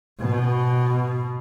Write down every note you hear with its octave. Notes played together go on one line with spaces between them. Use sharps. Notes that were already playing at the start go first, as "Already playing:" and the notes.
B2